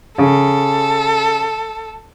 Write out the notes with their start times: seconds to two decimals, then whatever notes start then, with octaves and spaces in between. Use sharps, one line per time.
0.18 C#3 A4